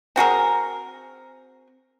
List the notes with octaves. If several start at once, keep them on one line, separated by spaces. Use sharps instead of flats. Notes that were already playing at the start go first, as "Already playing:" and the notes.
C4 F#4 G#4 A#4